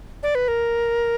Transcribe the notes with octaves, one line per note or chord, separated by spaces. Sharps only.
D5
B4
A#4